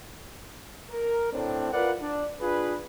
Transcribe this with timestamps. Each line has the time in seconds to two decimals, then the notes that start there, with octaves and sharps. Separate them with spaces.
0.91 A#4
1.32 A2 C4 D4
1.72 F4 A#4 B4 D5 F5 F#5
2.01 D4
2.41 D4 F4 G#4 B4